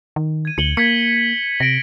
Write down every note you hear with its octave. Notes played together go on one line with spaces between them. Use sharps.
D#3
G#6 D#7
D2 C#7 F#7 G7
A#3 G#6 B6 C#7
C3 A#6 D7